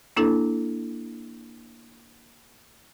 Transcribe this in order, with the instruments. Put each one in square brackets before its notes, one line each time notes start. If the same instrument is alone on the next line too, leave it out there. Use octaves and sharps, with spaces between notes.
[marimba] A#3 D4 E4 A4